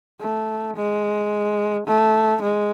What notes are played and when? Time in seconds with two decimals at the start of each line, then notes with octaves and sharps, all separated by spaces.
0.20 A3
0.76 G#3
1.87 A3
2.42 G#3